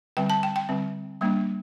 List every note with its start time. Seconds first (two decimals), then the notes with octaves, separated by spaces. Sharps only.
0.17 D3 G3 C4 G5
0.30 A5
0.43 G5
0.56 G5
0.69 D3 G3 C4
1.21 G3 A#3 D4